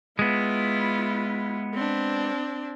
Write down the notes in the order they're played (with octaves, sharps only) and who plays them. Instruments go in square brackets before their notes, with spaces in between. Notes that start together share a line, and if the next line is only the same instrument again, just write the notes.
[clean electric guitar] G#3 B3 [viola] E4 F4
[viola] C4 D4